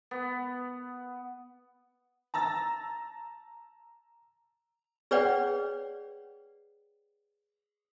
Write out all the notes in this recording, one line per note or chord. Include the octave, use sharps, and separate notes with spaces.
B3
A5 A#5 E6 A6
G#4 B4 C#5 D5 F#5 G5